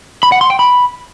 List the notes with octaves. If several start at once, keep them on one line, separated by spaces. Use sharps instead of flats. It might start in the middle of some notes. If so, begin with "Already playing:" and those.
B5
F#5
C6
G5
B5